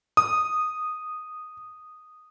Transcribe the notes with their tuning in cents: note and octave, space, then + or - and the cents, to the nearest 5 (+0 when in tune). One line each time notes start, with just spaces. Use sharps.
D#6 -10